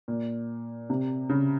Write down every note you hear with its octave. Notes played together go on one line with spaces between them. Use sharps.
A#2
C3
C#3